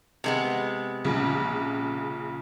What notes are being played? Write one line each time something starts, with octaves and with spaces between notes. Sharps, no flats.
C3 G#3 B3
A#1 C#3